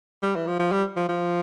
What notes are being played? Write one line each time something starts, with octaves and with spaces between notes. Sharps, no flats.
G3
E3
F3
F3
G3
F3
F3